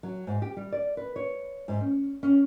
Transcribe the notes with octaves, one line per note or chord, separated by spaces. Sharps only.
F#3
G#2
G4
G3
D5
B4
C#5
G#2
C#4
C#4